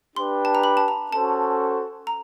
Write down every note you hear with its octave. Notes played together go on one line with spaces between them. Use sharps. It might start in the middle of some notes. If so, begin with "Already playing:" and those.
D4 G4 B4 C6
A5
A#5
B5
A5
A#5
C#4 F#4 A4 C5 A5
A#5